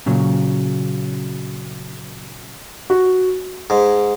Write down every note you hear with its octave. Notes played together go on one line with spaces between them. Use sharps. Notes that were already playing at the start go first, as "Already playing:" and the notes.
A#2 C#3 F#3
F#4
G#2